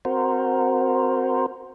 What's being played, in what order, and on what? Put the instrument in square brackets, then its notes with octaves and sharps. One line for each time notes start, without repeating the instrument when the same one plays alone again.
[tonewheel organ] C4 F#4 A#4 C5